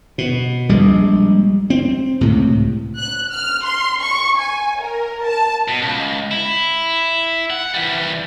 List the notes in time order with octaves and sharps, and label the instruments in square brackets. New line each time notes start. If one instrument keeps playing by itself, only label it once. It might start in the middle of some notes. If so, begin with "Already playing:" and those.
[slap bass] B2
A#1 G3 G#3
C4
C#2 A2 C3
[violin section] F#6
F6
C6
C#6
G#5
A#4
A5
[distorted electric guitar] B2
C#2
E4
F#5
E3 G3